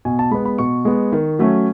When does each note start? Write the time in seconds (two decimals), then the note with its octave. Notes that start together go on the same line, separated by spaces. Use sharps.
0.05 B2 G#5
0.19 A5
0.31 G#3 B3 B5
0.45 B5
0.58 B2 C#6
0.85 G#3 B3
1.12 D#3
1.39 F#3 A3 C#4